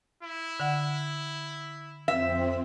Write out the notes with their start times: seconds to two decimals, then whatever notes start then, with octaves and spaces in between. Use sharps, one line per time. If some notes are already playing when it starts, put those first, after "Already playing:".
0.23 E4
0.60 D3 F#5
2.08 F2 C4 E5